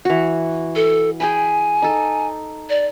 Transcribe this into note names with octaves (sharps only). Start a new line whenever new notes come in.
E3 F#4
A4
G#4 G5 G#5 B5
D#4 A4
D5